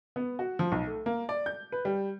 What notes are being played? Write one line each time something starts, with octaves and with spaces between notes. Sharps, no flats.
B3
F#4
F3
B1
A3
A#3
D5
G6
B4
G3